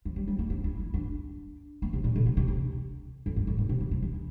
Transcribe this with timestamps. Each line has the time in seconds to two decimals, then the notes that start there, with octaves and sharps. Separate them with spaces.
0.05 F3
0.16 G3
0.28 G3
0.39 A#3
0.50 D4
0.64 E4
0.79 E4
0.94 D4
1.82 A#3
1.93 C3
2.04 A#2
2.16 D3
2.26 C3
2.37 C3
2.48 E3
3.26 F2
3.36 G2
3.47 A2
3.58 A#2
3.69 C3
3.80 E3
3.91 F3
4.02 E3
4.14 E3